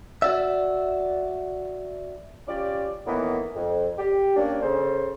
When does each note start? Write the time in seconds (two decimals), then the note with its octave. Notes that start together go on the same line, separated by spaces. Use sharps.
0.22 F#4 D5 E5
2.47 C#4 F4 G4 D5
3.06 A2 D#3 E3 A#3 B3
3.56 F2
3.98 G4
4.36 A#3 C#4 D4
4.62 C#3 A4 C5